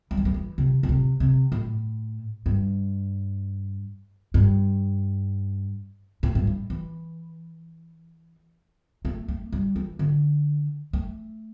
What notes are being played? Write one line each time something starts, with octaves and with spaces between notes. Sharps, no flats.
G3
E3
G3
E3
C3
A2
C3
C3
A2
G2
G2
A2
G2
A2
E3
A3
A3
G3
E3
D3
A3